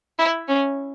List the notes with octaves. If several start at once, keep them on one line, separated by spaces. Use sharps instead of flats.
E4
C#4